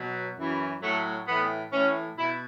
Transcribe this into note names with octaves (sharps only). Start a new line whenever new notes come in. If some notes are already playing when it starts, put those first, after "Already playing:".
Already playing: B2 F#3
F#2 E3
A2 F#3 A3
A2 E3 B3
A2 E3 C#4
B2 E4